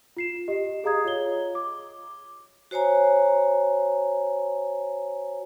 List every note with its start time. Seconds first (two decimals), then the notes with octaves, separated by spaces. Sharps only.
0.17 F4 C7 E7
0.48 G4 D#5
0.84 G#4 D#5 F5 A#5 D#6 G#6
1.05 F4 C#5 G7
1.55 D6
2.71 F#4 C5 C#5 G#5 A#5